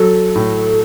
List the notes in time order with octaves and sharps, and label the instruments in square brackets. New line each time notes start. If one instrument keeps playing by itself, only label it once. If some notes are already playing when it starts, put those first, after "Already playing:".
Already playing: [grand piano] F#3 [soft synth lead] A4
[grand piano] A2